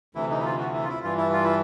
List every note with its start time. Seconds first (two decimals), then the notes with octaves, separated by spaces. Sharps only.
0.15 D2 C3 E3 E4
0.30 D#4
0.40 E4
0.45 F4
0.59 F#4
0.74 E4
0.84 F4
0.89 E4
1.04 G2 E3 F4
1.18 E4
1.33 F4
1.44 E4